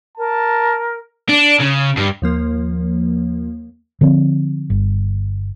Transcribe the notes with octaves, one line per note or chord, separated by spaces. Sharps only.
A#4 A5
D4
C#3
G2
D#2 F3 A#3
D3 F3 C4
G1